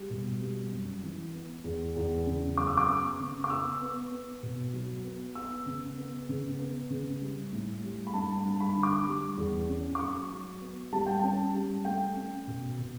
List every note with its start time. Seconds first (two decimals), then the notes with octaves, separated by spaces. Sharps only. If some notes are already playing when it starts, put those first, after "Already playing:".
Already playing: G3
0.10 B2
0.41 G3
0.72 F#2
1.03 E3
1.34 B3
1.64 E2
1.96 E2
2.27 C#3
2.57 F#2 D6
2.67 E6
2.78 D6
2.88 B3
3.19 C#3
3.44 D6
3.50 B3 E6
3.81 B3
4.12 B3
4.43 B2
4.73 F#3
5.04 B3
5.35 B3 E6
5.66 C#3
5.97 B3
6.29 C#3
6.59 B3
6.90 C#3
7.21 G3
7.52 A2
7.83 G3
8.07 B5
8.14 G2 A5
8.37 A5
8.45 G2
8.60 B5
8.76 D3
8.83 D6
9.07 G3
9.37 E2
9.69 C#4
9.95 D6
9.99 F#3 C#6
10.31 F#3
10.61 B3
10.93 G3 A5
11.06 G5
11.19 C#4 A5
11.54 G3
11.85 A3 G5
12.16 C#4
12.47 B2
12.78 B2